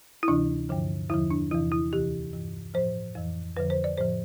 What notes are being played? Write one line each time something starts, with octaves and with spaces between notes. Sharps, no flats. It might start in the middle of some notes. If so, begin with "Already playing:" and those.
E4
D2 C3 E3 D4
G2 D3 F3
E2 D3 F3 E4
D4
E2 C3 E3 E4
E4
D2 C3 E3 G4
G2 E3
A2 F3 C5
F2 E3
F2 D3 F3 B4
C5
D5
A2 F3 C5